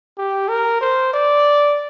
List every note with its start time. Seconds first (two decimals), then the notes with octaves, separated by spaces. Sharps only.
0.18 G4
0.48 A#4
0.81 C5
1.13 D5